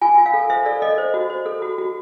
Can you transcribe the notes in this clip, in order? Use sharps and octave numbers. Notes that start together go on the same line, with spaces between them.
F4 G#5
F4
F5
A4
C5 E5
A4 D5
A4 D#5
C5
F#4
C5
A4
F#4
F#4